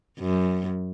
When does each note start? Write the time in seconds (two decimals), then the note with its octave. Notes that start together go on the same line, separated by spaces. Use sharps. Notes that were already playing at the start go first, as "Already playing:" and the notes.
0.19 F#2